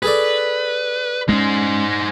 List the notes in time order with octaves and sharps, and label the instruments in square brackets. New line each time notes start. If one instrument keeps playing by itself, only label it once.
[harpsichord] G#4 A4 D5 [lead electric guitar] B4
[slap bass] G#3 C#4 [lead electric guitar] D#4 C5